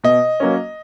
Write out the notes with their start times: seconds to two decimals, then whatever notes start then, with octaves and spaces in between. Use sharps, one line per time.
0.04 B2 D#5
0.40 F#3 A#3 C#4